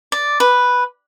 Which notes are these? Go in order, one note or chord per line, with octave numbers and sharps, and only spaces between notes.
D5
B4